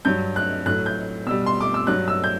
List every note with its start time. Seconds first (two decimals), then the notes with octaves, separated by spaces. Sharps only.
0.05 G2 F#3 G6
0.36 F#6
0.66 A2 F#3 F#6
0.86 G6
1.26 B2 G3 E6
1.46 C6
1.60 D6
1.74 E6
1.87 G2 F#3 F#6
2.08 E6
2.24 G6